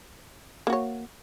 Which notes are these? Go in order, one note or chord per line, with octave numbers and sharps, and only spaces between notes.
A#3 F#4 C#5